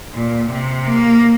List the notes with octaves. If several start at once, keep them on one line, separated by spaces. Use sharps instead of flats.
A#2
C3
A#3